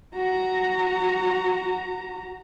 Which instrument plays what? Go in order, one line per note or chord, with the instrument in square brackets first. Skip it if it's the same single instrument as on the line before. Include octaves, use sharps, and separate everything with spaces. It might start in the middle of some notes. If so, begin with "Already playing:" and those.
[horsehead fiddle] F#4 A#5